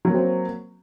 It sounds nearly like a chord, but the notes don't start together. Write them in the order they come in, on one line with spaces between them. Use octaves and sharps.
F#3 A#3 C4